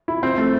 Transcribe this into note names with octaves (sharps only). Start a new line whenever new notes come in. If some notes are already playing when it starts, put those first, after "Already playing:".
E4
C4
A3